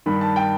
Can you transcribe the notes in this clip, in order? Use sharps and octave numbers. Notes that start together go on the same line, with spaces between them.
G2 D#3 B5
A5
G5